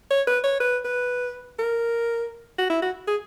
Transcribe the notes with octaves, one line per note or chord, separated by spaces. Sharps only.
C#5
B4
C#5
B4
B4
A#4
F#4
E4
F#4
G#4